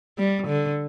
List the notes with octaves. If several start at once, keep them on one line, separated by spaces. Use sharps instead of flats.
G3
D3